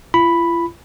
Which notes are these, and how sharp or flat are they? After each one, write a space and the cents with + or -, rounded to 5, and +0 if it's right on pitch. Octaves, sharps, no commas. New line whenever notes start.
F4 -45 B5 +0